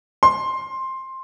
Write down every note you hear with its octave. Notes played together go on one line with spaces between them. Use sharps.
C6